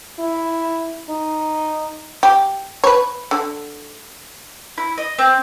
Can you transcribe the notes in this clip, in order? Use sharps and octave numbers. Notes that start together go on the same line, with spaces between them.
E4
D#4
G4
B4 C#5
D3
E4
D#5
C4